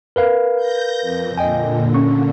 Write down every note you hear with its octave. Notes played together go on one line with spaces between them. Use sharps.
A#4 B4 F5
G6 A#6
F2
A#2 D3 D#5 G5 G#5
C#4 C#6